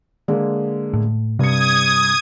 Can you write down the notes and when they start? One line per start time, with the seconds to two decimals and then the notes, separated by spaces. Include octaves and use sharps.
0.28 D3 G#3 A#3
0.93 A2
1.39 G2 C3 D#6 G#6 C#7